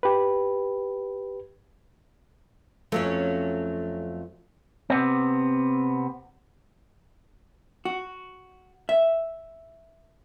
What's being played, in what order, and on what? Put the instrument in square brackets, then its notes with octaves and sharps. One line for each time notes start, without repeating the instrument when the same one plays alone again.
[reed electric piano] G4 B4
[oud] F2 F#3 C#4 [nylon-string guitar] A3 C#5
[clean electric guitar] C3 B3 C4
[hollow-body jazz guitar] F#4
E5